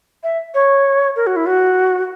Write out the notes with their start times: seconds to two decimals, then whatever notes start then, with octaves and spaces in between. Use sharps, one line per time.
0.23 E5
0.54 C#5
1.16 A#4
1.27 F#4
1.36 E4
1.46 F#4